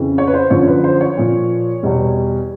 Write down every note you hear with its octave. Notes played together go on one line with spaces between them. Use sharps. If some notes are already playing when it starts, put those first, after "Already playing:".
Already playing: F2 C#3 E3
C#5
B4
C5
F#2 D3 F3 C#5
B4
C5
C#5
A#2 F3
E2 B2 G3